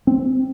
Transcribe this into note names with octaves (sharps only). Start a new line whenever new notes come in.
C4